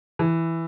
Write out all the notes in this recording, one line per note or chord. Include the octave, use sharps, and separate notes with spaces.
E3